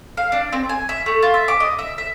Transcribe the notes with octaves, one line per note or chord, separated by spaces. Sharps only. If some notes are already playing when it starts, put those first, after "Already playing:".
F5
D4
C4
G#5
E5
A3
F4
E5
D6
D#5
E5
E5